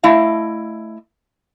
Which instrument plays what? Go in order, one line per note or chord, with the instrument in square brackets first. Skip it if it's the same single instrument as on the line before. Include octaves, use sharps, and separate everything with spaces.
[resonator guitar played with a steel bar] A3 E4 D#5 F5